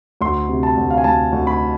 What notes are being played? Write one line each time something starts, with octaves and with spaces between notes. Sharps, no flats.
D2 C6
C3
A5
D2
F5
G#5
D2 A5
D2
B5